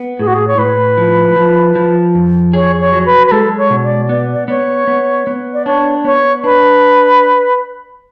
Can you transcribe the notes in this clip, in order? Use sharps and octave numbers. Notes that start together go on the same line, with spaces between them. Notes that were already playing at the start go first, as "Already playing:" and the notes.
Already playing: B3
A2 G#4
F#4
G#4
C#5
A2 B4
F3
F3
F3
F2
G#4 C#5
C#5
F#3
B4
B4
G#3 A4
C#5
B2
D5
B3 D5
D5
B3 C#5
B3
B3
D5
D4 C#5
B3 C#5
D4 B4